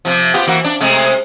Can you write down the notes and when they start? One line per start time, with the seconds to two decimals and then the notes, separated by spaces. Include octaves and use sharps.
0.05 C3 F3
0.34 B3 F4 G4
0.47 E3 A#3 F#4
0.65 D4
0.81 C3 G#3 A3